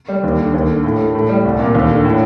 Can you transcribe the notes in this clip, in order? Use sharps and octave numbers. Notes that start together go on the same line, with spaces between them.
G3
D#2
D3
D#2
D3
A2
A3
A2
G3
C2
A#2
D#2
D3
A2